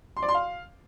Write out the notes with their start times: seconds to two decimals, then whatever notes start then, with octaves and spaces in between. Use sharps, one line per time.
0.17 C6
0.23 D5
0.29 C6
0.35 F5